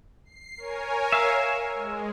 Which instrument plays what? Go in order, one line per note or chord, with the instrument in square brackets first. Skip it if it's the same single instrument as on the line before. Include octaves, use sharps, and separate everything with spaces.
[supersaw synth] C7
A#4 C#5 G#5
[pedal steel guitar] E5 F5
[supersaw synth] G#3